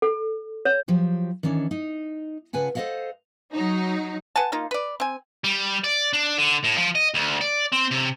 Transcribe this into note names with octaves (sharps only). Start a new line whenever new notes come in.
A4
C#5
F3 F#3 G4
D#3 E3 C#4 D4
D#4
C#3 F4 B4 F#5 G#5 A5
A4 C5 C#5 D#5 F5 F#5
F#3 D#4
B4 F#5 G#5 A5
A#3 D#4 F4
B4 D5
C4 G#5
G3
D5
D4
D3
A2
F3
D#5
D2
D5
C4
C3